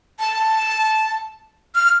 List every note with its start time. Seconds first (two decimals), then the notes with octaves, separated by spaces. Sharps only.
0.19 A5
1.75 F6